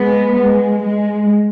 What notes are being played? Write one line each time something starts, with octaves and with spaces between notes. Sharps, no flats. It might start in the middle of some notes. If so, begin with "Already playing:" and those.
Already playing: G#3 B3
G#3
G#3